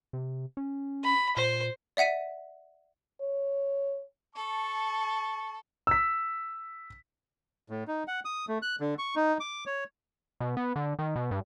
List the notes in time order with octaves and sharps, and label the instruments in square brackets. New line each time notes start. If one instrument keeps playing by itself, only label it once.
[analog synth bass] C3
C#4
[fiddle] B5
[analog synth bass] A#2 [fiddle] C5
[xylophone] D5 E5 F#5 B6 D#7
[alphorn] C#5
[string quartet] A4 [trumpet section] A5 C#6
[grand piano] E6 B6
[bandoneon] A2
D#4
F#5
D#6
A3
F#6
D3
C#6
D#4
D6
C#5
[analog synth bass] B2
B3
D3
D#3
B2
G2